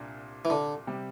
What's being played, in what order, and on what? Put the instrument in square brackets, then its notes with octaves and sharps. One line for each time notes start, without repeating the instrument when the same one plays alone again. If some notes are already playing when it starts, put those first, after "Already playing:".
Already playing: [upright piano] C2 A#2 D4
[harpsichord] E3
D3
[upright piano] C3 G3